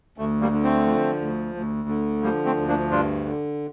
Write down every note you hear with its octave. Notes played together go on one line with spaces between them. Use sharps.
D2 A3
G3 A#3
D3
A3 C4
F3
D2
D2
D3
F3 G3 A#3
A3 C4
D2
A#3 D4
G2 D4 F4
D3